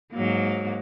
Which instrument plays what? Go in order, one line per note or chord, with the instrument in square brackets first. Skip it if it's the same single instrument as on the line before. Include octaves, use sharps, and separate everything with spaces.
[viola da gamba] G#2 F#3 A#3